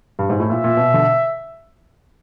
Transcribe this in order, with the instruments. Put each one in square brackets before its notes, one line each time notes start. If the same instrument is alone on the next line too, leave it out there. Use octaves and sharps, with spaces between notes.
[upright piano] G2
G#2
A2
[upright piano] A#2 [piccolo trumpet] E5
[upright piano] A#2
B2
D3